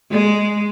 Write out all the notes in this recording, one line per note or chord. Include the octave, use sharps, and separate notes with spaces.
G#3